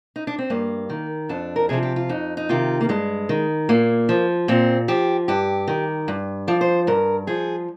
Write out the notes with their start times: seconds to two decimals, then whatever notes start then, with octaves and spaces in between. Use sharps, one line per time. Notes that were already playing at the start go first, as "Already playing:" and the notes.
0.16 D#4
0.27 D4
0.39 C4
0.50 G2 A#3
0.90 D#3
1.29 F2 D4
1.56 A#4
1.69 C3 F3 G#4
1.83 G4
1.96 F4
2.09 F2 D#4
2.37 D#4
2.49 C3 D#3 F4
2.81 A#3
2.89 G2 G#3
3.29 D#3
3.69 A#2 A#3
4.09 F3
4.48 A#2 C4
4.88 F3 G4
5.28 G2 G4
5.68 D#3
6.08 G2
6.47 F3 D5
6.61 C5
6.87 G2 A#4
7.27 F3 G#4